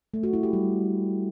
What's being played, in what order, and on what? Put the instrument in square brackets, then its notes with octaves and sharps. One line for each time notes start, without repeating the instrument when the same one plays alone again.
[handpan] A3
F#4
E4
G4
G3